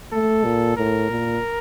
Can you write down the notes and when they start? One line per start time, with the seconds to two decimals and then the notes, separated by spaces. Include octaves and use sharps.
0.13 A3 A4
0.45 A#2
0.77 A2 A#4
1.10 A#2